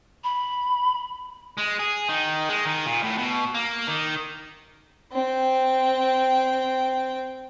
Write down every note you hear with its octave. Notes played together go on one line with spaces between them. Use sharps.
B5
G#3
G#4
D#3
G#3
D#3
A#2
A2
B2
A#3
D#3
C4 G5